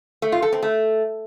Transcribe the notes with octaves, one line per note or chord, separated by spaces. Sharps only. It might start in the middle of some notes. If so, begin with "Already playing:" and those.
A3
F4
A4
C4
A3